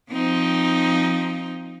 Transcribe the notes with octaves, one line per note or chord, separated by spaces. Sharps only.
F3 C4 D#4